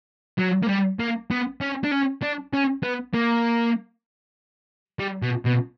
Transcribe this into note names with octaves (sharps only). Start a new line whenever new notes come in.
F#3
A#3
G3
A#3
B3
C#4
D4
C#4
D4
C#4
B3
A#3
G3
B2
B2